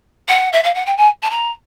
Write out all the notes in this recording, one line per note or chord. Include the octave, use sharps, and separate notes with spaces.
F#5
E5
F5
F#5
G5
G#5
A5
A#5